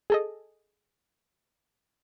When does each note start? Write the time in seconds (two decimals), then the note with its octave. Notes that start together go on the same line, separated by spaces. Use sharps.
0.10 G#4 A4 D#5